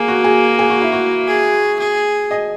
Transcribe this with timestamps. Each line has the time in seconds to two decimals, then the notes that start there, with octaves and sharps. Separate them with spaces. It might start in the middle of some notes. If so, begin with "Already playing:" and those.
Already playing: A#3 G#4
0.08 F#4
0.24 G#4
0.59 G#4
0.70 F#4
0.82 E4
0.92 F#4
1.27 G#4
1.79 G#4
2.31 D#5